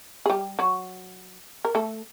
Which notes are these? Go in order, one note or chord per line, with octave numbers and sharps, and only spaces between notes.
G#4
G3 G4
F#3 F#4
A#4
A3 A4